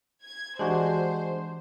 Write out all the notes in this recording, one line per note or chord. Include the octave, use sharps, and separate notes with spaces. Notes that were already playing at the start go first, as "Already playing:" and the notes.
G#6
E3 G#3 D4 F#4 G4 C5